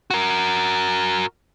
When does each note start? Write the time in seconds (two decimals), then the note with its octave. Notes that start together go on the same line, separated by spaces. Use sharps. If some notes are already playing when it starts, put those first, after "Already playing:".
0.10 F#4 A#4